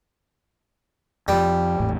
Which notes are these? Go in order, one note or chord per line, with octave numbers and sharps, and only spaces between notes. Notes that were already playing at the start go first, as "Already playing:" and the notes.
F2 F3 G3
G#1 E2 A2